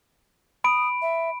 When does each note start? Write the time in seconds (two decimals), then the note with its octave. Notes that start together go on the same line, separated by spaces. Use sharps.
0.64 B5 D#6 D7
1.01 E5